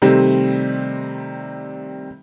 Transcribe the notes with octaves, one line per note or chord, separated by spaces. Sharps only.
C3 D#3 G3 A3 C4